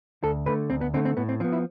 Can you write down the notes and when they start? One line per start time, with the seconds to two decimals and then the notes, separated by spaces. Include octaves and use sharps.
0.23 D2 A4
0.46 D3 A3 B4
0.70 D2 C4
0.81 B3
0.94 D3 A3 C4
1.05 C4
1.17 A2 B3
1.29 C4
1.40 F3 B3 C4
1.52 E4